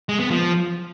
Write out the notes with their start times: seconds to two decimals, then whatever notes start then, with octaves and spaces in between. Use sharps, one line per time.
0.09 G#3
0.20 B3
0.30 F3